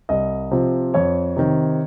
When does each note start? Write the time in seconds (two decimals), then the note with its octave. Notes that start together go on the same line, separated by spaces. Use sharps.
0.09 C2 D#5
0.51 C3 F3
0.94 F2 C#5
1.36 C3 D#3